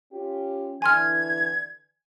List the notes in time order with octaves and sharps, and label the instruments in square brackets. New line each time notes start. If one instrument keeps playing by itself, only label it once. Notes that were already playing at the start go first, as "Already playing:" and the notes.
[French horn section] C#4 F4 G4
[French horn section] D3 E3 [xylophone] G#5 C6 F6 [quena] G#6